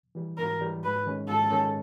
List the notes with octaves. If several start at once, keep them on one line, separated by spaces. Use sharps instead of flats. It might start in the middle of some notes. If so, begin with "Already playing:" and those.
E3 G3
G#2 A#4
E3 G3
G#2 B4
D#3 G#3 C#4
G#2 A4
D#3 G#3 C#4